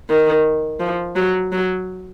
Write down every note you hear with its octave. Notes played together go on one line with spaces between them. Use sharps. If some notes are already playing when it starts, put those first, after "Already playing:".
D#3
F3
F#3
F#3